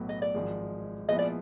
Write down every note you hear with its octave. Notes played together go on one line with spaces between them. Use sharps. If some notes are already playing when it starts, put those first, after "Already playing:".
Already playing: B1 A2 F#3 B3
D#5
D5
G#1 G#2 F3 G#3
A#2 F3 G#3 B3 E4 D#5
D5